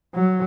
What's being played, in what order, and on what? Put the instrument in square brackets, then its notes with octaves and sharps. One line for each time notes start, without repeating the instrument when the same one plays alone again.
[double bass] F#3